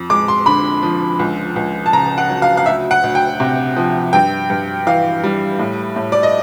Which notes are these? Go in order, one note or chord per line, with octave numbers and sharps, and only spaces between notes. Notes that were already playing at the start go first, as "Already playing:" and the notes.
Already playing: F2
G#3 D6
C6
D3 B5
F3
C#2
C#2
A5
C#3 A#5
F#5
F#3
F5
F5
D2 E5
F#5
D2
G5
C3
F3
G2 G5
G2
E3 F5
G3
A2
A2
D5
D#5